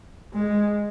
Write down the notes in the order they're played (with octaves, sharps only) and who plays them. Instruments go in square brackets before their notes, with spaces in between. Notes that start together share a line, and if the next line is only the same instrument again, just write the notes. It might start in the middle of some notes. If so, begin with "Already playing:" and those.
[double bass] G#3